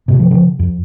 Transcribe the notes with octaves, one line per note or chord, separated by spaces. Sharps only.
G#2 C3
C#3 F3
C#3 F3
F2